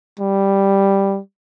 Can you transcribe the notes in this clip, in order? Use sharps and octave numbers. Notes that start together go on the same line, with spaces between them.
G3